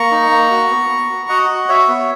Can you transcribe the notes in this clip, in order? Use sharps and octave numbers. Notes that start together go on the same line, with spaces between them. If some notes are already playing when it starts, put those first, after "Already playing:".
Already playing: A#3 A#5 C#6
D#4
A#3
F#4
B3
B3
F#4
F#4 D#5 F#5
F#4
F#4 C#5 E5
B3